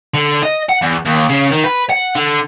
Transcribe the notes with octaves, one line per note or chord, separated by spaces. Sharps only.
D3
D#5
F#5
E2
D#2
C#3
D#3
B4
F#5
D3